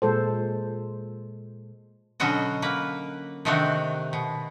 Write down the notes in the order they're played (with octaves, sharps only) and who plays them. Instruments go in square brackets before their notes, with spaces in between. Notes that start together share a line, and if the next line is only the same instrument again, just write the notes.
[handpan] A#2 G#3 A4 C5
[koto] B2 D3 F#3 C#4 F#4 D#5
A#3 B4
C3 D#3 A3 C4 D4 F#4
B2